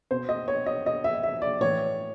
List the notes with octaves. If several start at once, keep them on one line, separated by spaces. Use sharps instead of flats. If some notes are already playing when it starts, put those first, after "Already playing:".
B2 C5
D#5
C#5
D#5
D#5
E5
E5
D5
A2 E3 C#5